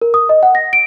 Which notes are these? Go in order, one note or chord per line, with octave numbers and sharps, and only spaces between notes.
A#4
D#6
D#5
F#5
A#6
D7